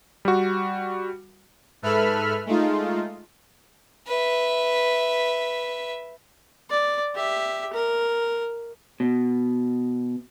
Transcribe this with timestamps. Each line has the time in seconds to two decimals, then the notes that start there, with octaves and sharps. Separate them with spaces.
0.25 G3 F#4
1.82 G#2 A4 B4 E5 B5 F6
2.46 G#3 A3 D#4 F4
4.07 B4 E5
6.70 D5
7.15 G4 E5
7.73 A#4
9.00 B2